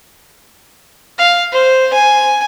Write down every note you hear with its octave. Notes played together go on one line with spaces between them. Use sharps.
F5
C5
G#5